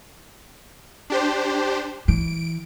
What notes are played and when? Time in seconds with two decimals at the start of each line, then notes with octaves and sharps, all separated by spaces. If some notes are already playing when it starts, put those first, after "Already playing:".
1.10 D4 G4 C5
2.08 E3 D7